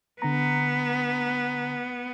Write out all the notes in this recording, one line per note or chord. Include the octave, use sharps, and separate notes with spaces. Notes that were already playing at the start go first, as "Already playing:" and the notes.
D3 B3 A#5